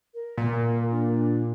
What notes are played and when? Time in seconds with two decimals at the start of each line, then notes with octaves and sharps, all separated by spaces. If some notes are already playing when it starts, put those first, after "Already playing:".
0.14 A#4
0.38 A#2
0.91 D4